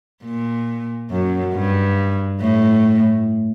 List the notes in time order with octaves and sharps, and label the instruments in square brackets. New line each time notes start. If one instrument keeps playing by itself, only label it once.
[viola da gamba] A#2
F#2
G2
A2